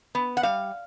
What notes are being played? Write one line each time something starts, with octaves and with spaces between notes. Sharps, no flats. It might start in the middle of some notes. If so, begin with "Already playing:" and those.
B3
F#5
G3 F5